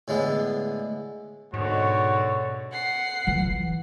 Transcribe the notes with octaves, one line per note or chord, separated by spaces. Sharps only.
A2 D3 G#3 B3
G#2 B2 D3 F#4 C#5
F#5 C7
E3 F#3